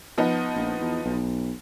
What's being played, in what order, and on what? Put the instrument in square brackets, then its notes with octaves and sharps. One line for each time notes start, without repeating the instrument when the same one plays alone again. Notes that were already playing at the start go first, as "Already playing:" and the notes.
[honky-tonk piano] F3 B3 D#4
[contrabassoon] A#1
E2
B1